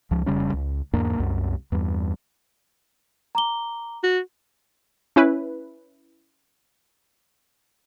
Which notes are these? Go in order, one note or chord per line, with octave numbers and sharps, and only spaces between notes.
C#2 F3
F1 C#3 G3 C#4
C#2
E2 G#2 A#3 D4
C2 F#2
E2 G2
A#5 D6 G7
F#4
C#4 E4 B4